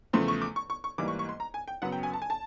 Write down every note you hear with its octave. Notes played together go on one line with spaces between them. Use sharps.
E2 C#3 F3 A3 C6
C#6
D6
C#6
C#6
C#6
G#2 E3 G3 A#3 D6
C#6
C#6
C6
A#5
G#5
G5
F#2 C#3 F#3 B3 F#5
G5
G#5
A5
G#5
A5